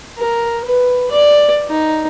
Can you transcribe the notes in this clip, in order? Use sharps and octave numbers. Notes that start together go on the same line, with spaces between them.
A#4
B4
D5
D#4